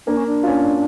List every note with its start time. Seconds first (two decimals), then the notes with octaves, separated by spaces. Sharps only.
0.07 A#3 D4
0.17 C#4
0.27 D4
0.43 C#4 F4